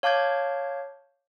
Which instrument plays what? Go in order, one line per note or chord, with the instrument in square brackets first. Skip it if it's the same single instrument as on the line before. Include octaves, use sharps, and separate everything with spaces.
[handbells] C#5 F5 A5 D6 G6 G#6